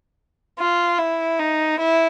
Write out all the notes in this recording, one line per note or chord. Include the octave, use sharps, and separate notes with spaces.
F4
E4
D#4
E4